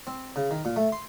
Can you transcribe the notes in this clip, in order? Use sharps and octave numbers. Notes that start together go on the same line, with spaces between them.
C4
C#3
D#3
A#2
A3
C6